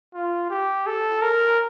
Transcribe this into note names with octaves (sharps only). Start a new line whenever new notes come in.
F4
G4
A4
A#4